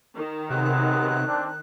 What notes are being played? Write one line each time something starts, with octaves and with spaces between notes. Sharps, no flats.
D#3
C3 F#3 G#3 B3 F#6
C4 D4